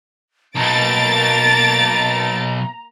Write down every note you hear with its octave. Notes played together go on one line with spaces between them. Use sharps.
B1 B2 A#3 A5 A#5 A6 D7